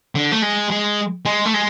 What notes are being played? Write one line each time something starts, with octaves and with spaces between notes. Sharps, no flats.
D3
A3
G#3
G#3
G#3
A3
G#3